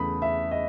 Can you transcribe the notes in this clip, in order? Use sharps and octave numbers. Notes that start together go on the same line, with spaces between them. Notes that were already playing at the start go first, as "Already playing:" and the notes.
Already playing: E2 C#3 A3 B5 D#6
E5
D#5